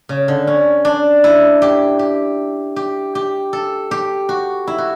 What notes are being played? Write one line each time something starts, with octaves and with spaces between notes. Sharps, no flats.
C#3
D3
C#4
D4
E4
G4
G4
G4
G4
A4
G4
F#4
E4
F#4